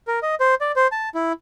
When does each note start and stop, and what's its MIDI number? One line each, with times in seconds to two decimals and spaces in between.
0.07 0.19 70
0.23 0.35 75
0.40 0.55 72
0.61 0.72 74
0.76 0.88 72
0.92 1.09 81
1.15 1.33 64